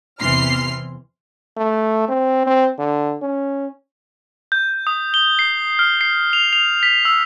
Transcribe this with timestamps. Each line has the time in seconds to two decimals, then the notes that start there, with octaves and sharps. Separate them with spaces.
0.19 E2 C3 E3 C6 F6 C7
1.57 A3
2.09 C4
2.47 C4
2.79 D3
3.22 C#4
4.52 G6
4.87 D#6
5.14 G7
5.39 C7
5.79 F6
6.01 C7
6.33 F7
6.53 F7
6.83 B6
7.05 E6